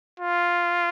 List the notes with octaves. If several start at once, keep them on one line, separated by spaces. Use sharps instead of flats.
F4